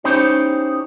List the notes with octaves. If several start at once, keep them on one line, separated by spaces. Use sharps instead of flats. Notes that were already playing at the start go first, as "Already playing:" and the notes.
C#4 D#4 E4 G4 C5 C#5